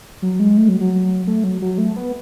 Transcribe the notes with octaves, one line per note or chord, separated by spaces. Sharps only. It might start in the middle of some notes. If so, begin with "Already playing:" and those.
F#3
G#3
A3
F#3
F#3
A3
F#3
F#3
A3
B3